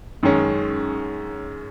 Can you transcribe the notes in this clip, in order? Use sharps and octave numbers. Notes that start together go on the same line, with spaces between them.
F#2 D#3 G#3 C#4